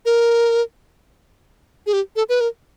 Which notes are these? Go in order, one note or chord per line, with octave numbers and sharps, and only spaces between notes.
A#4
G#4
G4
A4
B4
A#4